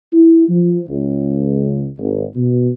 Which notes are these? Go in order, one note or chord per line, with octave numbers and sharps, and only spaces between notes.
E4
F3
C#2
G#1
B2